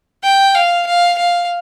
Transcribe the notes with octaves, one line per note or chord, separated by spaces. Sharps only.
G5
F5
F5
F5